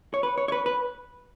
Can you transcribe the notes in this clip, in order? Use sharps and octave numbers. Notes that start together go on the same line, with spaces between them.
C#5
B4
C#5
C#5
B4
B4